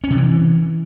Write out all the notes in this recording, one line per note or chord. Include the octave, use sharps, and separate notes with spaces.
C#4
C3
E3